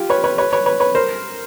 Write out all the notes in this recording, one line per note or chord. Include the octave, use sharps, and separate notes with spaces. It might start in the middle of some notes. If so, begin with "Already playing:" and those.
Already playing: F4 G4
B4 C#5
B4 C#5
B4 C#5
B4 C#5
B4 C#5
B4 C#5
A#4 C5